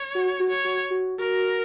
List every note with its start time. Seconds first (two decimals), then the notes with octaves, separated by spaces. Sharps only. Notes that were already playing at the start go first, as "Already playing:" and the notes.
Already playing: C#5
0.15 F#4
0.40 F#4
0.49 C#5
0.65 F#4
0.90 F#4
1.19 F#4 A#4